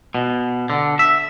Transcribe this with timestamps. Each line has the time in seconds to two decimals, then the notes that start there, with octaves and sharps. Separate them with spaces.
0.15 B2
0.70 D3
0.99 E5